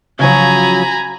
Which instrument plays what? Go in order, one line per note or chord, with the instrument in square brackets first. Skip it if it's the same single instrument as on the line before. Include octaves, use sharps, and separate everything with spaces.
[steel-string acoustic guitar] C#3 F3 F#3 [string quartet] G#5 A#5 B5